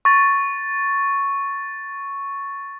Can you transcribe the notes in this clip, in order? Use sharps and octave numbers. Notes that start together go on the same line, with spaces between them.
C#6 A6